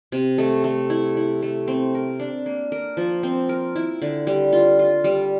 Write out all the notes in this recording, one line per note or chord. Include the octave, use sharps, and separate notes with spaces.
C3
A3
A3
E4
E4
A3
C4
A#4
D4
A#3
A#4
F3
C4
A#4
E4
D3
G3
F4
F4
G3